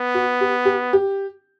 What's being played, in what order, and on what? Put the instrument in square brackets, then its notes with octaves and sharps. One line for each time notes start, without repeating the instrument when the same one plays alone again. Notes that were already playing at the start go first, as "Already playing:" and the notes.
Already playing: [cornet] B3
[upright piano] F#4
G4
G4
G4